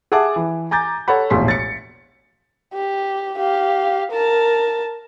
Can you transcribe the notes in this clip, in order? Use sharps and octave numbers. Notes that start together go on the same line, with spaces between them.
G#4 E5 F#5 A5 D6
E3
G#5 A#5 D6 G6 A6
A4 C#5 F#5 B5
E1 A#1 E2 A2 C6 B6
A6 C#7
G4
G4 F5
A#4 A5